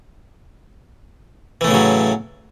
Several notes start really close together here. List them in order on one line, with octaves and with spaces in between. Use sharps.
E3 A3 A2 C#3 F#3